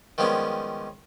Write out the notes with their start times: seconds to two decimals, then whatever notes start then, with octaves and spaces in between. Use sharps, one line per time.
0.18 D#3 F3 G3 G#3 B3 C#4